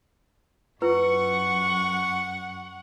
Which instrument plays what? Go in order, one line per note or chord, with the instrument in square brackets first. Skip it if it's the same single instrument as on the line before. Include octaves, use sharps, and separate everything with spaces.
[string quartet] F#2 [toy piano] E4 F4 B4 [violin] F#5 [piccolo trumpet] C#6